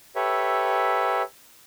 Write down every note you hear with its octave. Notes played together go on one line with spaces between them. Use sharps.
G4 A4 B4 C#5 E5